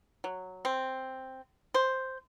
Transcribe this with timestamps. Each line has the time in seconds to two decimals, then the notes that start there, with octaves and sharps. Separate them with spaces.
0.24 F#3
0.65 C4
1.74 C5